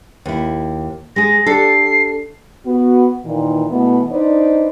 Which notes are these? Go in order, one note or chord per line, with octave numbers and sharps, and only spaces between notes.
D#2 E4
G#3 G#4 A#6
D4 G4 A4 C7
B3 F#4
A#2 D#3 E3
B2 E3 A3 B3
D4 D#4 B4 C5 D5 D#5